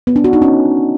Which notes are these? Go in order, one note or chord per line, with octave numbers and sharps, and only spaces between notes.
B3
D4
F#4
D#4
C#4